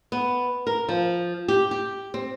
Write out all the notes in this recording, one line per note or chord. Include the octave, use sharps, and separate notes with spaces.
B3
A#4
F3
G4
G4
C4